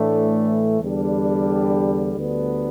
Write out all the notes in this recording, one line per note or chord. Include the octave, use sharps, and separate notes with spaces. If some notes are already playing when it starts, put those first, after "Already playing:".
Already playing: A2 E3 A3 D4
E2 D3 G3 D4
D2 D3 G3 B3 D4